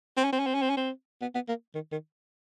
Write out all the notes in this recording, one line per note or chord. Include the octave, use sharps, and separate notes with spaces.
C4
C#4
C4
C#4
C4
C#4
C4
C#4
C4
B3
B3
A#3
D#3
D#3